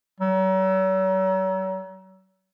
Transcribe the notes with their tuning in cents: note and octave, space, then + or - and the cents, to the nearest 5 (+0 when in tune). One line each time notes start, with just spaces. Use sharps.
F#3 +40